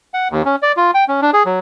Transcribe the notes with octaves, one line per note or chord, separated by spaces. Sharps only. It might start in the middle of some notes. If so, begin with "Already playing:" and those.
F#5
D#2
C#4
D5
F4
G5
C#4
D4
G#4
F#3